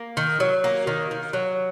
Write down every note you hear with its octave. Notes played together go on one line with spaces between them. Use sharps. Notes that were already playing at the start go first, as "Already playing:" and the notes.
Already playing: A#3
D#3
F#3
A#3
D#3
D#3
F#3